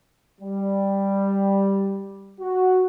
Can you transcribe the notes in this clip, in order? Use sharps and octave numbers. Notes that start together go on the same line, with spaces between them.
G3
F#4